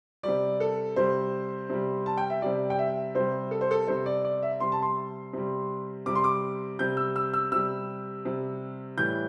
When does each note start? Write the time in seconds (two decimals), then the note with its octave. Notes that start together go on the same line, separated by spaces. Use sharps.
0.23 C3 G3 D5
0.60 A4
0.96 C3 G3 C5
1.70 C3 G3
2.06 A5
2.17 G5
2.30 E5
2.42 C3 G3 D5
2.70 G5
2.79 E5
3.15 C3 G3 C5
3.51 A4
3.61 C5
3.71 A4
3.87 C3 G3 C5
4.06 D5
4.24 D5
4.43 E5
4.60 C3 G3 C6
4.72 A5
4.82 C6
5.33 C3 G3
6.06 C3 G3 D6
6.15 C6
6.24 D6
6.79 C3 G3 G6
6.97 E6
7.16 E6
7.34 E6
7.52 C3 G3 E6
8.25 C3 G3
8.97 A2 E3 G3 G6